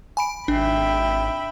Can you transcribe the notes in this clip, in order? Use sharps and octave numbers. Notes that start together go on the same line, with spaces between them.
G#5 B5 D7
G#1 D4 E5 G5 B5